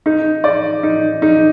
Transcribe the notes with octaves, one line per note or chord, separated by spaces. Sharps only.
D#4
D5
D#4
D#4